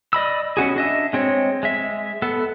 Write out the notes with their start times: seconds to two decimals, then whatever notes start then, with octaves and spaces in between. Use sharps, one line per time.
0.13 D5 D#5 B5 E6
0.57 B3 C#4 F#4 G#4
0.76 D4 D#5 E5
1.13 G#3 C4 C#5
1.63 G#3 E5
2.22 B3 A4